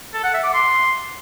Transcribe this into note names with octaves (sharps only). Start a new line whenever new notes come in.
A4
F#5
E5
D6
C6